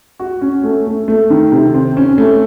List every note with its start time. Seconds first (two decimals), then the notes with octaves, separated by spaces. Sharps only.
0.19 F#4
0.42 C#4
0.64 A3
0.87 A3
1.08 A3
1.30 D#3
1.52 C3
1.74 C4
1.97 C#4
2.18 A3